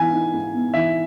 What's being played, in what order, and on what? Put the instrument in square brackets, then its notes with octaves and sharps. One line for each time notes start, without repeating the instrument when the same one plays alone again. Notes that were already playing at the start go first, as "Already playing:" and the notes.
Already playing: [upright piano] G#2 E3 B3 [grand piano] G#5
[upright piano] D#4
G#2
B3
[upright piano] E3 [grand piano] E5